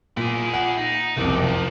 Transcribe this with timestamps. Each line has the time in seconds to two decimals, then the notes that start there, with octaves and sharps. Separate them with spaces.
0.17 A#2 E4 G#4
0.54 F#5
0.78 D#4
1.17 F#1 C2 F2 A3 D5
1.43 F3